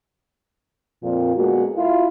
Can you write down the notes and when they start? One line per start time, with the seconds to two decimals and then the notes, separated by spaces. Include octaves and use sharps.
1.02 F2 A#2
1.34 D3 G#3 A#3 B3 F#4
1.75 E4 F4